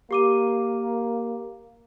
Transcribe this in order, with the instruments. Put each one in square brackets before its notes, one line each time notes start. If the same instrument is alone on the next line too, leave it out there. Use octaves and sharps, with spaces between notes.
[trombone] A#3 [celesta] G4 D6 D#7